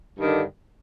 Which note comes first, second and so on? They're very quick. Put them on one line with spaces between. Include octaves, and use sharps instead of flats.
G2 D#3 D3